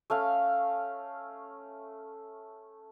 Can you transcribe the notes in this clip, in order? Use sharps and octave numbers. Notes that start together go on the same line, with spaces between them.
A3 C#4 F5